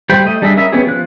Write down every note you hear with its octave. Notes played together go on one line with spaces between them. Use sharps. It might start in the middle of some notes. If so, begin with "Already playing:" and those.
G3 G4 C5 G5 B5
A3 D#5
G3 D4 G#4 D#5 E5
C#4 A#4 D#5 E5 B5
B3 C#4 G4 G#4
F3 F#6